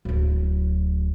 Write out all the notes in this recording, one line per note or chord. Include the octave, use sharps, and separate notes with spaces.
D1 F#3